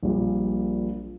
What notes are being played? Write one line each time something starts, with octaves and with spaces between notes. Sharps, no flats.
A#1 A#2 G3